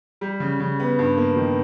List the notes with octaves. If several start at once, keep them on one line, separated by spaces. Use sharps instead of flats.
G3
C#3
C#3
B3
G2
A#3
D#3